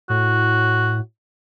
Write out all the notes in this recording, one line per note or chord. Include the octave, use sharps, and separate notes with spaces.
A2 F#4